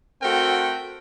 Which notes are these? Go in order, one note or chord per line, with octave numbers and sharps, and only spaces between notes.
A3 C4 F#4 A#4 F#5 G5